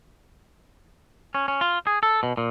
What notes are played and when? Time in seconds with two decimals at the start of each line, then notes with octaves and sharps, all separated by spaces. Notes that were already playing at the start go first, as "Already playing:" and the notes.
1.35 C#4
1.48 C#4
1.61 F4
1.87 G#4
2.03 A4
2.23 B2
2.37 A#2